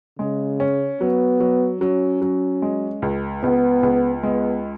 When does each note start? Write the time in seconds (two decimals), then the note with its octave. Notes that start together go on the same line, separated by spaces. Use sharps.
0.19 C#3 G#3
0.60 C#4
1.01 F#3 B3
1.40 F#3
1.81 F#3 C#4
2.21 F#3
2.62 G#3
3.02 C#2
3.43 C#2 B3
3.83 C#2
4.23 G#3 B3